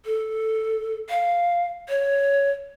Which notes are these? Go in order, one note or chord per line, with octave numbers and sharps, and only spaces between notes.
A4
F5
C#5